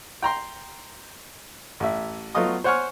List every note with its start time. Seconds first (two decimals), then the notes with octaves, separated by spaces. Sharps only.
0.22 G5 A#5 C6
1.80 A1 E5
2.35 F#3 A3 B3 F4 D#5 D#6
2.64 C5 C#5 F#5 G#5 C#6 F6